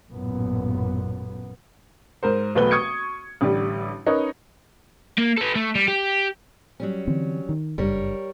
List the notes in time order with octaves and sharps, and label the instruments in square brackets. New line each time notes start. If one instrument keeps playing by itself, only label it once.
[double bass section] A1 F#2 A#2 B3
[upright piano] G#2 A#4 C5
E1 B1 A3 B3 B4 G7
C#6 D#6 G#6 C#7
A1 D3 G3
C#4 D#4 A#4 B4 C#5
[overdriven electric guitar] A#3
A4 B4
A3
G3
G4
[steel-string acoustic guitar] F#3 G3 C#4
[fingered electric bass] D3 E3 C4
D#3
[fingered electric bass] F#1 G2 [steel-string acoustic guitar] G3 A#4 C#5